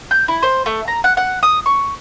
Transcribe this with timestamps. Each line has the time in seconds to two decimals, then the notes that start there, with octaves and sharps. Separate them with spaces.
0.11 G6
0.28 E4
0.43 C5
0.66 A3
0.88 A#5
1.04 F#5
1.17 F#5
1.43 D#6
1.66 C#6